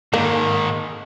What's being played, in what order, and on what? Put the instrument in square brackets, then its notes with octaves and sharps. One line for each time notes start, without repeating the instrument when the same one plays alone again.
[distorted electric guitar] G#2 D#3 [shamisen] A#3